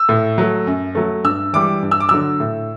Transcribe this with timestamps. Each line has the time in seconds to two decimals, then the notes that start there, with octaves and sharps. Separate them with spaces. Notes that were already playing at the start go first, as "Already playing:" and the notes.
Already playing: E6
0.09 A2
0.38 F#3 A3
0.67 F#2
0.95 F#3 A3
1.24 G2 E6
1.53 E3 G3 D6
1.82 G2
1.91 E6
2.00 D6
2.09 D3 F#3 E6
2.40 A2